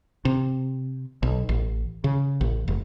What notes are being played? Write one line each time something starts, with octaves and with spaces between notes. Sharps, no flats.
C3
B1
A1
C#3
A1
F1